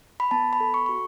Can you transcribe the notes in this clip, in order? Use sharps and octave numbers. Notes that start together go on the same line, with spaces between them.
B5
B3 A5
B5
A4
C#6
F#4 C#6